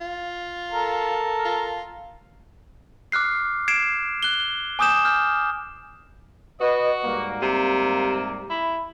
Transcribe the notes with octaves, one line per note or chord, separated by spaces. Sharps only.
F4
A4 A#4
F4
D6 F6 F#6 C7
G#6 C7 D7 E7
F#6 G7
G#5 D6 D#6 G6 E7
F6 G6
F#4 B4 D#5
G#2 G3 A#3
C3
E4